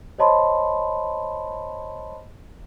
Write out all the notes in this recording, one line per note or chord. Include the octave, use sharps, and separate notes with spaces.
C5 C#5 D#5 A5 B5 C6